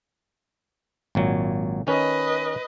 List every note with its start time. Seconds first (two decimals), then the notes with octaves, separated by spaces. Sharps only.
1.15 G#1 A#2 F#3
1.87 D#3 C#4 B4 D#5